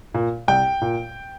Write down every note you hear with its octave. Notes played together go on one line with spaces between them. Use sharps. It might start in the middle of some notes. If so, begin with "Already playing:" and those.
A#2
C2 G5
A#2